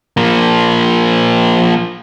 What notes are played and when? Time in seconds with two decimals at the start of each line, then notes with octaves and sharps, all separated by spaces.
0.17 F3 A#3